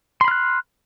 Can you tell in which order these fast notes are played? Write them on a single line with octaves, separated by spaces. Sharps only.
C6 B5 F6 F#6